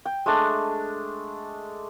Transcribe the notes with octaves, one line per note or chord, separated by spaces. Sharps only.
G5
G#3 A3 D4